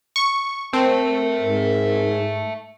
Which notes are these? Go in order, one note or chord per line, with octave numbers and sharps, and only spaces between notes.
C#6
C4 A#4 E5 A5
G#2